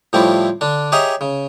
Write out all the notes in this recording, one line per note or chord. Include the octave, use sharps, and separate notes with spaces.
A2 F3 G3 A3 C4 E4
D3 D4
G4 G#4 C#5 D#5 E5 A#5
C#3